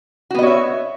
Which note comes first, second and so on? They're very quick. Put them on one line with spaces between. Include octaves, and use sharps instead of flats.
F#4 B3 D#5 C#5 E5